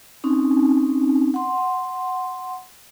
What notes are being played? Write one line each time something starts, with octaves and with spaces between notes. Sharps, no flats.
C4 C#4 D#4
F#5 C6